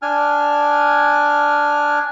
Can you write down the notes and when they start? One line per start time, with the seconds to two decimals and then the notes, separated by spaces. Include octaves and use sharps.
0.02 D4 G#5 F6